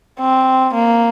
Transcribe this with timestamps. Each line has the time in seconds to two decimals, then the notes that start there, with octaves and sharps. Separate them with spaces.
0.20 C4
0.74 A#3